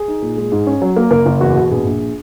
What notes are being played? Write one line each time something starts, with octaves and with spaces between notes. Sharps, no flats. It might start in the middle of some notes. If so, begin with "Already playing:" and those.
Already playing: G#4
D#4
A#2
G#3
G#2
C#4
F#3
A#3
F#1 A#4
F#1
E2 F#4
B2
A#1 G#4
A#1